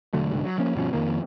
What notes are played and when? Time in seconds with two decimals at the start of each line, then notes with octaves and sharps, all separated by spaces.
0.13 E1 D3 F#3 A3
0.31 C2 G#2 D3
0.45 F#3
0.58 F3 A#3 C#4
0.75 G1 B2 F3 C#4
0.93 F2 D#3 F3 A#3